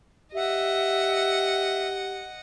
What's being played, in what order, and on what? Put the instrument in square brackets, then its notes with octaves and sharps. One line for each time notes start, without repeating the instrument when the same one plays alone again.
[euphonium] G4 [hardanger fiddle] D#5 F#5 [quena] E5